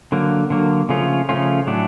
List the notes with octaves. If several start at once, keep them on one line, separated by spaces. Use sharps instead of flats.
D3 F#3 A#3
D3 F#3 A#3
C#3 F3 A3 C#4 F4
C#3 F3 A3 C#4 F4
A2 F#3 A3 D4